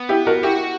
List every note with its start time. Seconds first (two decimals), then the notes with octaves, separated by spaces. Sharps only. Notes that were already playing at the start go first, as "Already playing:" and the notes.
Already playing: B3
0.09 E4 G4
0.27 F#4 A#4
0.43 E4 F#4 G4